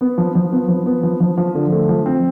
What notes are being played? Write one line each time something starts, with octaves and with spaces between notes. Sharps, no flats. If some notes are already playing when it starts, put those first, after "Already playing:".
B3
F3
F3
B3
F3
B3
F3
F3
F3
D3
A3
F3
C4